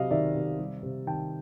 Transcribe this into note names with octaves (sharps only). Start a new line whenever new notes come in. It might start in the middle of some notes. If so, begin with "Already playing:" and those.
Already playing: C3 F#3 D#5 F5
D#3 D5 E5
C3
G3
C3
D#3 G5 A5